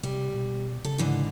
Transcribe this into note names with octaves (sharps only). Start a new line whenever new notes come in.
C3 G3
B2
C#3 A4
G#2 D3 E3